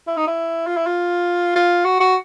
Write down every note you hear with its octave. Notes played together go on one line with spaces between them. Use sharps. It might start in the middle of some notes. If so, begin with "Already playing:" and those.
E4
D#4
E4
F4
E4
F4
F4
F#4
F#4